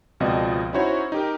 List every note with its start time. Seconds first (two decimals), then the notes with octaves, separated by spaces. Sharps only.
0.20 C#2 B2 F3 C4 D5 D#5
0.73 C#4 D#4 E4 F#4 C5 C#5
1.12 D#4 G4 A#4